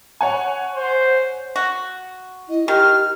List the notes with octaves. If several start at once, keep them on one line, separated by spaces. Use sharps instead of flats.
C#5 F#5 G#5
C5
F#4
E4 D#5
D#3 G4 F6